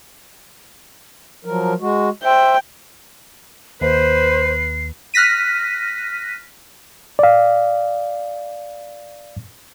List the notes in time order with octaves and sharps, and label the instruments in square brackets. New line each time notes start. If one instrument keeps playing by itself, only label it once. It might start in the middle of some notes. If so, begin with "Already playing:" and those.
[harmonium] F3 F#3 A#4
G#3 F#4
[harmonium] C5 E5 [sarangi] G5
[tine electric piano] D#2 [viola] B4 [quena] C5 [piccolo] C7
[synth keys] F6 F#6 A#6 B6 D#7
[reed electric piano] D5 F5